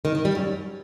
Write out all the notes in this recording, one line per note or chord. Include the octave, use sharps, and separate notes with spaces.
D#3
D#3
G3
F#2